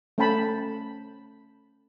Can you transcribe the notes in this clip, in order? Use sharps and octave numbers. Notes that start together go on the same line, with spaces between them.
A3 C#4 C5 G5 A5 B5